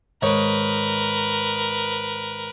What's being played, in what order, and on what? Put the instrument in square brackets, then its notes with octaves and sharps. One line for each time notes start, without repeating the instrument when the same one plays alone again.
[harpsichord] G#2 D#3 C#5 [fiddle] A#4 B4